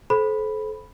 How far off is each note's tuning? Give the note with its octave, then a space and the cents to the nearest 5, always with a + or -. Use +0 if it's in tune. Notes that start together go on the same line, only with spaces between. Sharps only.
A4 -30 C5 +0 B5 +0